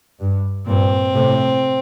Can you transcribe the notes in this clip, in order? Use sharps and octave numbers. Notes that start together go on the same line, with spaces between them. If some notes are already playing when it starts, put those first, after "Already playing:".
G2
G2 A#2 C4
A2 C3